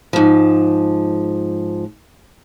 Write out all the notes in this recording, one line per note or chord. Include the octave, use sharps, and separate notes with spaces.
G#2 F3